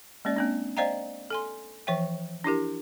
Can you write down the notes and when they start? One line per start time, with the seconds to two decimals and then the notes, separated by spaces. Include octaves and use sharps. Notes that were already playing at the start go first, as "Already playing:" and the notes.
0.25 G#3 A#3 C#4 D5
0.36 A#3 C4 D4
0.77 C5 D5 D#5 F5 G5 A#5
1.30 A4 G#5 C6
1.87 E3 F3 C#5 E5 G5
2.44 D4 E4 G4 A#4